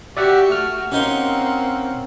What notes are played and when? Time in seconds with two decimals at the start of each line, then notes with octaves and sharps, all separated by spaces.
0.17 F#4 G4 D5 E5 F#5
0.52 A3 F6
0.92 A#3 C4 C#4 D#4 F#5 C6